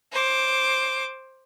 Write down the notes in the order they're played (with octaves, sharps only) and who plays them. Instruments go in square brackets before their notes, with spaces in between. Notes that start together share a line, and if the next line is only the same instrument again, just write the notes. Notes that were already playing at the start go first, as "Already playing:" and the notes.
[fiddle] C5 D6